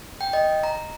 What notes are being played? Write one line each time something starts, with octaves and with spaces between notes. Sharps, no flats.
G5
D#5
A#5